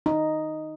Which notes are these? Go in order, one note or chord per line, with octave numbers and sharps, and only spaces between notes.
D#4